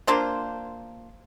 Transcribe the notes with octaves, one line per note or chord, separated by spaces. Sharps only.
A#3 D4 F4 C5